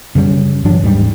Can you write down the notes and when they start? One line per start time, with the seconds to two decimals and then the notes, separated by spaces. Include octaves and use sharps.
0.15 F#2 C#3 G3
0.65 G2 E3 F#3 D4
0.82 D#1 G#2 G3